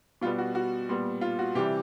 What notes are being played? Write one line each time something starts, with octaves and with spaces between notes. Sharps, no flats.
B2 G3 B3 F4
F#4
F#4
A#2 G3 B3
F4
F#4
C3 E3 G3 G4